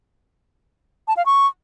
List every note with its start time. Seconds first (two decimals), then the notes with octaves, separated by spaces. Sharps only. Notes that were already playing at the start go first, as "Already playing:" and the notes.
1.08 A5
1.17 F5
1.26 C#6